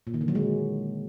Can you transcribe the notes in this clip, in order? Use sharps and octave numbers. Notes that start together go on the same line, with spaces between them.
A#2
D#3
D3
F#3
G#3